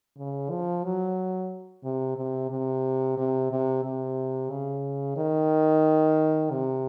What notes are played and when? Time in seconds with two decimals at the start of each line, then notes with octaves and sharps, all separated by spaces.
0.17 C#3
0.50 F3
0.84 F#3
1.83 C3
2.17 C3
2.50 C3
3.18 C3
3.51 C3
3.84 C3
4.50 C#3
5.17 D#3
6.51 C3